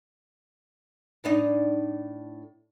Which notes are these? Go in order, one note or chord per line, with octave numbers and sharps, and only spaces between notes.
A2 D4 D#4